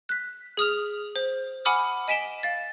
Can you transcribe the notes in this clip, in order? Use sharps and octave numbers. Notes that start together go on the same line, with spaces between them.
F#6 B6
G#4 D#6 F6 F7
C5
F#5 G#5 B5 D6 D#6 F6
D#5 G#5 B6 D7 E7 G7
F5 A6